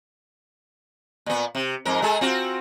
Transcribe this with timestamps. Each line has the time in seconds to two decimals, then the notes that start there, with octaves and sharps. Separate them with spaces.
1.26 A#2 B3
1.55 C3
1.85 F2 G#2 A#4
2.02 G#3 G#4 A4
2.21 C4 F4 F#4